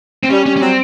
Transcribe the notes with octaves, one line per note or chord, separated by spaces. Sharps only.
C4
G3 C#4
G3 C#4
C#4
F#3 C4